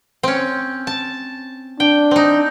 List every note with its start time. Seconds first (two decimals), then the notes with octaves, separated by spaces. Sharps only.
0.23 C4 C#4
0.87 A5
1.80 D4 G5
2.11 C4 D#4